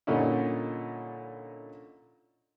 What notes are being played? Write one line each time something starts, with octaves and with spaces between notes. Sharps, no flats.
A#2 D3 G3 C#4 D#4 E4